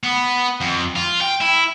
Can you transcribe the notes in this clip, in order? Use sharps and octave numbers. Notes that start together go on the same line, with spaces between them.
B3
F2
F4
G5
E4